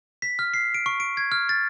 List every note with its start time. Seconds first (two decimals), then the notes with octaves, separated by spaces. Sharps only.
0.22 B6
0.39 F6
0.54 C7
0.74 D7
0.86 C#6
1.00 D7
1.17 G#6
1.32 F6
1.49 A6